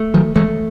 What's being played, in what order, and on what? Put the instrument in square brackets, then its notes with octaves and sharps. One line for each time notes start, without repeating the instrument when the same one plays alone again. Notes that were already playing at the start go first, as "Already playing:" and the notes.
Already playing: [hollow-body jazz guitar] A3
[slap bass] D#3 F#3
[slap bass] E3 G#3 [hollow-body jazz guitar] A3